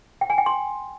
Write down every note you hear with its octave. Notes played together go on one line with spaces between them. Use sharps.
G5
G#5
G5
C6